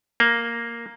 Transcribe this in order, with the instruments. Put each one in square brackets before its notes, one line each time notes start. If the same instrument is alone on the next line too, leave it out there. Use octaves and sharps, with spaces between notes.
[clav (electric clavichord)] A#3